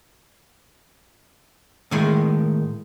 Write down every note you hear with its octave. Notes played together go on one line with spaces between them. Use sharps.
A2 D#3 G#3